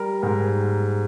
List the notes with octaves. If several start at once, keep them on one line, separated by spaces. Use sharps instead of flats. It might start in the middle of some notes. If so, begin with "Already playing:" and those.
Already playing: G3 A#4
G#2 A#4